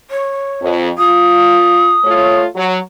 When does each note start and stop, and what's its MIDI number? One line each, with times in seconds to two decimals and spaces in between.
0.11 0.72 73
0.61 0.90 41
0.98 1.96 65
0.98 2.38 87
2.04 2.46 57
2.04 2.46 65
2.04 2.46 73
2.55 2.78 54